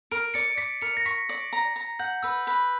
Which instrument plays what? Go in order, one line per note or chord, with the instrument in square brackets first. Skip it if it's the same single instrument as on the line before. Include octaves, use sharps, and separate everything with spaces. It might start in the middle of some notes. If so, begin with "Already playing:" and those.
[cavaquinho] A#4 [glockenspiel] D7
[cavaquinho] D5 [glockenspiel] C#7
[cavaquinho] D5 [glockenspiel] B6
[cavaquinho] A#4 [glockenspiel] C#7
[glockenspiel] A#6
[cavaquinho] C#6 [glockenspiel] B6
[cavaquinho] D5
A#5
A#5
[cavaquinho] F#5 [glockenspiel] G6
[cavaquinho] B4 [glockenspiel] E6
[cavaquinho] B4